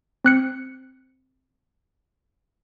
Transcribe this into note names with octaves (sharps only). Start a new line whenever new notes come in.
C4 F#6 C#7